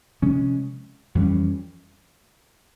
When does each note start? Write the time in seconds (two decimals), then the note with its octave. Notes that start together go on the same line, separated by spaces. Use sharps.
0.22 C3 F3 G#3 C#4
1.15 F2 E3 G3 C#4